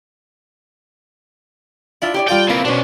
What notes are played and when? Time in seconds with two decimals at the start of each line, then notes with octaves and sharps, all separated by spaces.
2.02 D4 E4 F4 E5
2.14 G4 C#5 D5
2.28 G3 F4 A4 D5 F5 G5
2.49 A#3 C4 E4 F4 B4 F5
2.65 B2 C#4 D4 C5 C#5